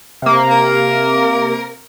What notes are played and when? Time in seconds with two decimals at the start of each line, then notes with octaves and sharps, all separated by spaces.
0.22 C3 A#3
0.51 A#4